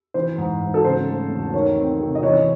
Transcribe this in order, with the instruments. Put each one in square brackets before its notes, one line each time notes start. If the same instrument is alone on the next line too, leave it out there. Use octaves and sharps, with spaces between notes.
[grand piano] E3 [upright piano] C5
[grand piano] G#2
G#2
[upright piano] A4
[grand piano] C#3 [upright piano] C5
[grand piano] A3
E2
[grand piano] D#3 [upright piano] C#5
[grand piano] C4
C3
[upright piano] D#5
[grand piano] E3 [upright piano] C#5